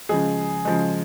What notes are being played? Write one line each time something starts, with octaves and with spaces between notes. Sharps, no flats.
C#3 F3 G#3 G#4
C#3 F3 G#3